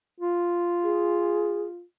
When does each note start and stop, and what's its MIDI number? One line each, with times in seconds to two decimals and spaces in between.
0.20 1.83 65
0.84 1.63 68